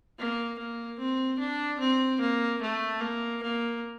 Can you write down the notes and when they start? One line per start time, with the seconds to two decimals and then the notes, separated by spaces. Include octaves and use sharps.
0.18 A#3
0.58 A#3
0.99 C4
1.38 D4
1.80 C4
2.20 A#3
2.61 A3
3.01 A#3
3.42 A#3